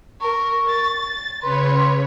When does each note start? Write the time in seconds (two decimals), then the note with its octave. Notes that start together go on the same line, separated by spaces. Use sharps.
0.21 A#4 C#6
0.69 A6
1.43 C#3 B4 C#5 C6